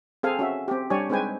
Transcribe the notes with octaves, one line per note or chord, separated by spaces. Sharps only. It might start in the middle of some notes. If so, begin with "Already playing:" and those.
C4 G#4 A4 F5 G#5
C#4 F#4 E5
C4 G4
G3 D4 G4 C#5 D5 G#5
G#3 C4 D#4 B4 G5 G#5